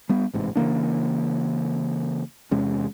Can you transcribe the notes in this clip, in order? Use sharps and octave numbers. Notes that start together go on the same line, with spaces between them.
G3 B3
A1 G#2 C3
C#3 E3 A#3 D4
E2 C3 G#3 C#4